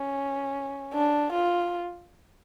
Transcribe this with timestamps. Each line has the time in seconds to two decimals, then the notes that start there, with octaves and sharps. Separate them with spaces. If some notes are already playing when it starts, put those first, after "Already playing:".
Already playing: C#4
0.94 D4
1.33 F4